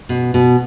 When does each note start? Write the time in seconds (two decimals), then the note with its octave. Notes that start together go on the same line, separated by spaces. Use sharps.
0.09 B2
0.34 B2